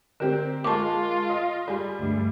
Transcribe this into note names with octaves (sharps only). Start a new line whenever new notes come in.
D3 C4 G4 A#4
G#3 A#3 F4 A5 C#6 D6
D#5 F5
G3 G#4
D2 G2